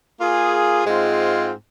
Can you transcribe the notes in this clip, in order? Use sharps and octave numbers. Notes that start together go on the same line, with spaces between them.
A#3 F4 G#4
G#2 G#3 C4 F4